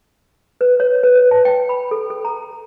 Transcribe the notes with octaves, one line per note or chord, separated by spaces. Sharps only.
B4
C#5
B4
B4
A5
G5
B5
A4
A4
A#5